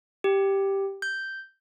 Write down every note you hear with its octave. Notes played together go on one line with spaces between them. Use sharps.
G4
G6